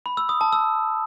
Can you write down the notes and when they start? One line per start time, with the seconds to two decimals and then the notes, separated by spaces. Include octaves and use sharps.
0.06 B5
0.17 E6
0.29 D#6
0.41 A5
0.53 E6